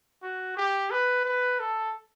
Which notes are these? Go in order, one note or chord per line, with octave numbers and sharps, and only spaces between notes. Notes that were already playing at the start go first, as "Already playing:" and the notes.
F#4
G4
B4
B4
A4